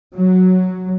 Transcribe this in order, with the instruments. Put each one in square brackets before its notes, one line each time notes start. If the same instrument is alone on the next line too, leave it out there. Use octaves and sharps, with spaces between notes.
[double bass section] F#3